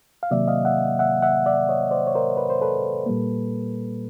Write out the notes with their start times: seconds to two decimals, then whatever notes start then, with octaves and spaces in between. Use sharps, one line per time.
0.23 F5
0.31 C3 D#3 F#3 A#3 D5 E5
0.48 D#5 F5
0.65 E5 F#5
0.99 E5 F#5
1.22 E5 F#5
1.46 D5 E5
1.69 C#5 D#5
1.91 C5 D5
2.07 C#5
2.15 A#4 C5
2.37 B4
2.50 C5
2.62 A4 B4
3.06 A#2 G3 A#3